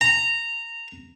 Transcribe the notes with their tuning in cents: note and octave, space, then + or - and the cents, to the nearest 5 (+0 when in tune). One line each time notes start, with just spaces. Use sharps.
A#5 -15